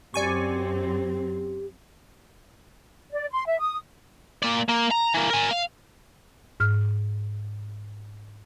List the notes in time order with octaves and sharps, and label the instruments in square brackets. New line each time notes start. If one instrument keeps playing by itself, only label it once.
[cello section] F#2 C4 [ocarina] G4 [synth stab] D5 G#5 C#6
[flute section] D5
C6
E5
D#6
[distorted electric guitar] A#3 D5
A#3
A#5
E3 A#3
A#4 G#5
F5
[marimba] G#2 F6